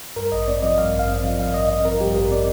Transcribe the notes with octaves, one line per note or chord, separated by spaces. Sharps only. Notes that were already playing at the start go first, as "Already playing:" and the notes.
G2 A#4
A1 D#5
C4 D5
F3 D#5
G2 F5
A1
F5
C4
F3
G2 F5
A1 D#5
C4 D#5
F3 A#4
G2 G4
A1 A#4
C4 D5